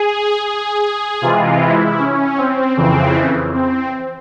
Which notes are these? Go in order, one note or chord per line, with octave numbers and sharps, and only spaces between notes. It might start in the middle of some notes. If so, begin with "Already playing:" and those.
Already playing: G#4
G#4
C3 E3 G#3 F4
E4
C#4
C4
F2 C#3 E3 C4
C4